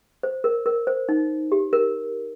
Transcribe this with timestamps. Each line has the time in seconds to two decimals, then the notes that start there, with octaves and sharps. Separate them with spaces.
0.23 C5
0.44 A#4
0.66 A#4
0.87 C5
1.09 D#4
1.52 G4
1.73 A#4